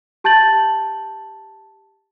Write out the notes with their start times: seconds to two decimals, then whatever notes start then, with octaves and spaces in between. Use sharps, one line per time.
0.24 G4 A5 G6 A6 F#7